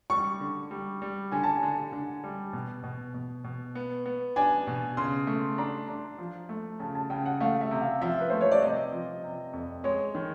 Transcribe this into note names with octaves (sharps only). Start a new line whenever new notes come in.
G3 C#6
D3
G3
G3
D3 G#5
A5
G#5
D3
D3
G3
B2
B2
B2
B2
B3
B3
D4 G#5
B2
C#3 C6
A3
D4 A#5
D4
F3
A3
C#3 A5
A5
C#3 G5
F#5
A3 F5
E5
C3
F5
F3 E5
B4
A3 C5
C#5
D5
C3 D#5
F3
C3
F2
G#3 C#5
D#3